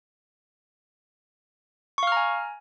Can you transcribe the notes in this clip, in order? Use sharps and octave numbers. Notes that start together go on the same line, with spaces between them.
F5 G#5 A#5 C#6 F6